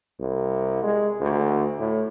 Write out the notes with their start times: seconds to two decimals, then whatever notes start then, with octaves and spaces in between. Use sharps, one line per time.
0.20 C2
0.83 G#3
1.21 D2
1.80 A2